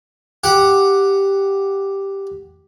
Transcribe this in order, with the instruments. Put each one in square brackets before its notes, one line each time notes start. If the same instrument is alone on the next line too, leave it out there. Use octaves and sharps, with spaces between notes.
[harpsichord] G4 F#5